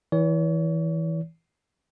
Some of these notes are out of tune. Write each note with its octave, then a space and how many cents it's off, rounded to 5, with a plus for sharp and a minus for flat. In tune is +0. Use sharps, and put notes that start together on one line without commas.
E3 -15 C#5 +40